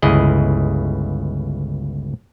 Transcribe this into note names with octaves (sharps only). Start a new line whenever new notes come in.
G1 C#2 E4 G#4 D#5